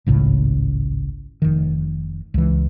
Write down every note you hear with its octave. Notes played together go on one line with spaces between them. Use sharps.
G#1 C#2 A2 C#3
F1 D#3
C#2 E3